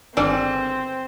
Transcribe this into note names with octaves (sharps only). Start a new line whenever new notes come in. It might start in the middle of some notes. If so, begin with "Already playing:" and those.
G1 D#3 C4 D4 G#4 B4 G#5